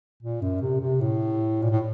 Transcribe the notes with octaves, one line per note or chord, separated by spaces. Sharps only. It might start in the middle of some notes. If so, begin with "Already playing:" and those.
A#2
F#2
C3
C3
A2
A#2
A2